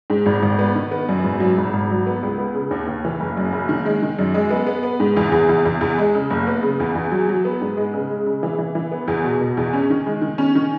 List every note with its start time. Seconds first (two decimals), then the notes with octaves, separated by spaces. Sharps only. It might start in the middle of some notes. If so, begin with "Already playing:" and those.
0.10 G#2
0.26 G#1
0.43 G#1
0.59 B3
0.75 D#3
0.91 B3
1.09 F#2
1.24 G#1
1.40 F#3
1.58 G#1
1.73 G#1
1.90 F#3
2.07 B3
2.23 C#2
2.38 B3
2.54 C#3
2.71 D#2
2.87 D#2
3.05 E3
3.20 F#1
3.37 F#2
3.52 F#1
3.69 D#3
3.85 G#3
4.02 D#3
4.19 F#2
4.34 G#3
4.50 B3
4.67 B3
4.83 B3
5.00 G#2
5.17 E2
5.32 E2
5.49 E2
5.65 E2
5.81 E2
5.98 G#3
6.15 C#3
6.30 F#1
6.47 B3
6.63 C#3
6.80 E2
6.95 E2
7.11 F#3
7.29 F#3
7.45 B3
7.61 G#2
7.77 G#3
7.94 C#3
8.10 G#3
8.27 C#3
8.43 E3
8.59 E3
8.75 E3
8.92 B3
9.08 E2
9.24 B2
9.41 B2
9.57 E2
9.73 C#4
9.90 D#3
10.06 G#3
10.22 D#3
10.38 C#4
10.55 D#3